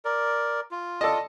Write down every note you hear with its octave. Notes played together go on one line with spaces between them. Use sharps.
A#4 D5
F4
A4 D5 D#5